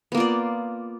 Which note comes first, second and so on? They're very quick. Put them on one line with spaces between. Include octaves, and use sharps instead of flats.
B3 A#3 F4 D5